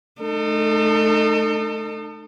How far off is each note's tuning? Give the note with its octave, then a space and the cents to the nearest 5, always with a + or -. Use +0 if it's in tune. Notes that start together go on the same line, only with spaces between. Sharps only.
A3 -30 D#4 -30 A4 +30